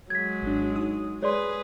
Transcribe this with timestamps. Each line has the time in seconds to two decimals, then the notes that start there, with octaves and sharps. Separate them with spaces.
0.10 F#3 G#3 G#6 B6
0.42 G#1 D4
0.76 D#4 D#6
1.22 G#3 G#4 B4 C#5 D5 C6